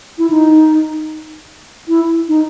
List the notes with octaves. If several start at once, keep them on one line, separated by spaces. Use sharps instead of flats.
E4
D#4
E4
D#4